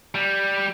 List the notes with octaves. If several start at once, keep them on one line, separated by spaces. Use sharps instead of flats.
G3